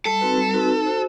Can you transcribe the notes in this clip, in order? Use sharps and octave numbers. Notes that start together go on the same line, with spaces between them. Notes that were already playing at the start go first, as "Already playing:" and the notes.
G3 A4
C4 D#4 F#4 B4
G3
C4 D#4 F#4 B4
D#4
F#4 C5